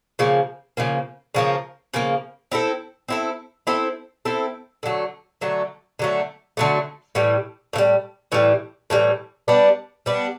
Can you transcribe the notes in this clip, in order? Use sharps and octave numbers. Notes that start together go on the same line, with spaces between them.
C#3 F3 A#3
C#3 F3 A#3
C#3 F3 A#3
C#3 F3 A#3
C4 E4 A4
C4 E4 A4
C4 E4 A4
C4 E4 A4
D3 F#3 A3
D3 F#3 A3
D3 F#3 A3
D3 F#3 A3
A2 E3 G3
A2 E3 G3
A2 E3 G3
A2 E3 G3
G3 B3 D4
G3 B3 D4